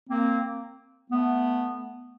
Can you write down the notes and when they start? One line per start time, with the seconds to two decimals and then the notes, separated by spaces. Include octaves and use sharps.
0.10 A#3 C4
1.11 A3 B3